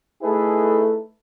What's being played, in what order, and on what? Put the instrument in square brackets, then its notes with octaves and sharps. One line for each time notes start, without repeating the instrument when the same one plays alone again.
[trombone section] A3 D#4 E4 G#4 A4 B4